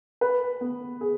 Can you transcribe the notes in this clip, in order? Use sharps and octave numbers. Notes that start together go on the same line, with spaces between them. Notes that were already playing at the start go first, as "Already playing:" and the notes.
B4
B3
G#4